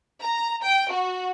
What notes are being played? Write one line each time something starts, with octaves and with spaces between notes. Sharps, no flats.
A#5
G5
F#4